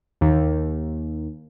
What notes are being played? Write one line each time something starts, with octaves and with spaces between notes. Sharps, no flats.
D#2